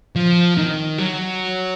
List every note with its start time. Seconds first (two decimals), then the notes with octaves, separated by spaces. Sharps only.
0.16 F3
0.57 D#3
0.98 F#3